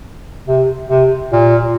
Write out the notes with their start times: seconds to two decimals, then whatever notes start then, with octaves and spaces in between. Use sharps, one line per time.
0.47 C3
0.89 C3
1.32 A#2